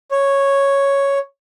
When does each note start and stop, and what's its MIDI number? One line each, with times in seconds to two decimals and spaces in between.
0.11 1.18 73